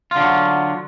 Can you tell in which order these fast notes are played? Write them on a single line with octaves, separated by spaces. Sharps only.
F4 D3 F#3